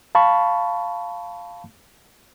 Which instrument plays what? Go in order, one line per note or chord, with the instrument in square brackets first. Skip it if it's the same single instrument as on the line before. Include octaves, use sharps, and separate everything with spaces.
[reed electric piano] F5 A5 B5 C#6